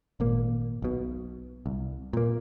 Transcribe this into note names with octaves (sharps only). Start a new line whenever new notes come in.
G#1 A#2 A#3
B1 B2
C2
A#2 A#3